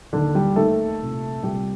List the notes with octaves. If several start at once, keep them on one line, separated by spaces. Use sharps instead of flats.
D#2 D3 D#3 D4
G3 G4
D#2 D#3 A3 A4
C2 A#2
C2 A#2 G3 G4